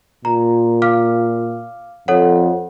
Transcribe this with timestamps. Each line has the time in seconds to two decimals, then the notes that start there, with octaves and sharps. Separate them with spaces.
0.25 A#2 A#5
0.82 F5 D6 F6
2.08 F2 A4 C#5 F#5